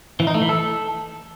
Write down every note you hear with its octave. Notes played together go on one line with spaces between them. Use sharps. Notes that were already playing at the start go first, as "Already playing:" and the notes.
E3
D#4
A3
E3
A4